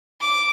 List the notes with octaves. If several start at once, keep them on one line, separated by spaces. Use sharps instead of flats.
D6